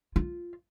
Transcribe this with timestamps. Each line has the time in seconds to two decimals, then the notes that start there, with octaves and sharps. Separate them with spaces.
0.16 F4